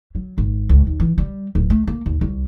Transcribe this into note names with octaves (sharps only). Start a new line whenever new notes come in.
F#3
G#1
C#2
D#2
E3
G3
D1
A3
A#3
D#2
C2